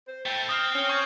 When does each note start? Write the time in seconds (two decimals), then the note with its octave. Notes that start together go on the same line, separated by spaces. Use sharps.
0.08 C5
0.26 A3 E4 G5
0.49 C4 D#6 F6
0.75 C#4
0.89 C#6 G6 G#6